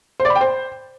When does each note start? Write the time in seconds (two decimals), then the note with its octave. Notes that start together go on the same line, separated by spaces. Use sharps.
0.20 C5
0.25 D5
0.30 B5
0.35 G5
0.41 C5